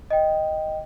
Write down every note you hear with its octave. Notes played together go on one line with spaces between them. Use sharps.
D#5 G5